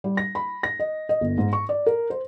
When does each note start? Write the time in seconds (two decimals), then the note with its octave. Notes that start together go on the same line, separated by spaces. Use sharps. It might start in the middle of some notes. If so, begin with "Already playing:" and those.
0.04 G3
0.17 A#6
0.35 B5
0.63 A#6
0.79 D#5
1.09 D#5
1.21 G1
1.38 G#2
1.53 C#6
1.69 D5
1.86 A#4
2.10 C5